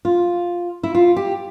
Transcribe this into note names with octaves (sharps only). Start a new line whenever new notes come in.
F4
E4
F4
G4